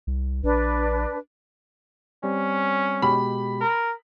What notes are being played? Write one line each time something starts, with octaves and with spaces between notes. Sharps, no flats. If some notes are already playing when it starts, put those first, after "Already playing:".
C2
A#1 D4 B4
G3 C4 C#4
B2 G#3 G4 B5
A#4